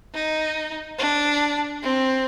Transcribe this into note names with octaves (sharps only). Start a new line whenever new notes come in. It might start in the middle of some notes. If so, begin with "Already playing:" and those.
D#4
D4
C4